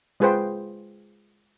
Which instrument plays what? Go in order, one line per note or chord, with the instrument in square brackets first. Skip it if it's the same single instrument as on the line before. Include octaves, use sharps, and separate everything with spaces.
[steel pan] G#3 F4 G#4 B4 C5 G5